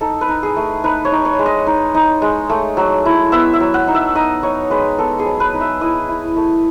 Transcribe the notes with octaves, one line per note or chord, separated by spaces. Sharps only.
D#4 A4
B4
D#4
G#4
A3
D#4 B4
C#5
D#4
C#5
G#3
D#5
D#4
D#4
G#3
A3
F#3
E4
B3 E5
E5
F#3
F#5
D#4
E5
D#4 D#5
D#4 C#5
G#3 B4
B3 A4
G#4
F#3
B4
D#4
E5
E4 D#5
E4
A3